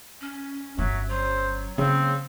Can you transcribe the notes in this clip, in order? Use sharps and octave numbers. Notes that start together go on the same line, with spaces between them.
C#4
G1 F#3 C#4 E5
F#3 C5
C#3 A#3 C4